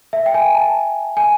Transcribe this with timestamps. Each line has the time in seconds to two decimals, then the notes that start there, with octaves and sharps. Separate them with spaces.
0.13 E5
0.26 G5
0.34 G#5
0.55 A5
1.17 G#5